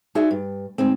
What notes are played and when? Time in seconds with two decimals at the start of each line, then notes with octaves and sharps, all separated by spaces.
0.15 D#4 F#4 G#4 C5 D5 E5
0.31 G2
0.78 D2 G#2 G#3 C4